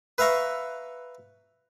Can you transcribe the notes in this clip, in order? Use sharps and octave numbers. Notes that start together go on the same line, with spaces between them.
B4 E5 F5 A#5 C#6